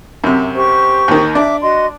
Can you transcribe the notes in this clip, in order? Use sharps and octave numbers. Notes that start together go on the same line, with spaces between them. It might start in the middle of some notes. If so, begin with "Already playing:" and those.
F#2 C3
G4 C5 C#6
D#2 D#3
D4 E5 D6
F#4 D#5 C6